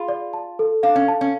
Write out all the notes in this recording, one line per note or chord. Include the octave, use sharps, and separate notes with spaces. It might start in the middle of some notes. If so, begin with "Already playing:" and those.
Already playing: F4 G#4 B5
D5
A5
A4
D4 F5
C#4
A5
C#4